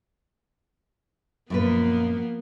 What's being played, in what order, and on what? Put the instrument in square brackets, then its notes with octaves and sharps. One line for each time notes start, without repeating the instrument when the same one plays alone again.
[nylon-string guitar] F#2 A#2 B4 [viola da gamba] F3 A#3 B3